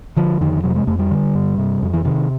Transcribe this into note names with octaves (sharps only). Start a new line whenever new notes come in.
D3 F3
F2 D#3
C3 F#3
G#3
F2 A3
G3
D3
G2
C3
F2
E3
C3 D#3